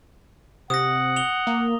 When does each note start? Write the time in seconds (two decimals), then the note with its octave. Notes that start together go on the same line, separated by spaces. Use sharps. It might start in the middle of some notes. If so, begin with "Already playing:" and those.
0.70 C3 F#5 D#6 A#6
1.16 F7 G7
1.47 A#3